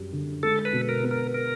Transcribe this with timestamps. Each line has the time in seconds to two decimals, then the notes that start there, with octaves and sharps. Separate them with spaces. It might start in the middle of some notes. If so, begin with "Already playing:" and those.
Already playing: F#2 G3
0.13 D3
0.43 G#3 A4
0.65 B4
0.73 B2
0.89 A#4
1.03 B3
1.11 A#4
1.34 A#4